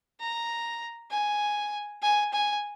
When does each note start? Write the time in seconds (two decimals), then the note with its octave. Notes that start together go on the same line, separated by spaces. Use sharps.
0.20 A#5
1.11 G#5
2.02 G#5
2.33 G#5